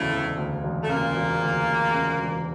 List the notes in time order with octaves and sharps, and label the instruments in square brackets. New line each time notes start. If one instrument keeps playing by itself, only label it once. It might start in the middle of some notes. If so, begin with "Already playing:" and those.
Already playing: [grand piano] E1 D2 C#3 [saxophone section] A2 A3
[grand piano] E1
D2
E1
[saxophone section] A3
[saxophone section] A#2 A#3 [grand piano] C#3
[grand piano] E1
D2
E1
C#3
E1